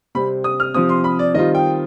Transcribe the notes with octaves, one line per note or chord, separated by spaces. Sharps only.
C3 G3 C4 B5
D#6
F6
C3 F3 C4 D#6
C6
B5
D5
D#3 G3 C4 F4 D#5
G5